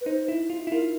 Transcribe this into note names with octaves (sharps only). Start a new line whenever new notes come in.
B4
D#4 C5
E4
F4
E4
F4 A#4